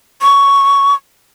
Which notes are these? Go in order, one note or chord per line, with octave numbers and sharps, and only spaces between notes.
C#6